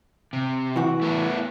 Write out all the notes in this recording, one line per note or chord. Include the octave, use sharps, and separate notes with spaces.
C3
E3 F#4
A3 B3 E4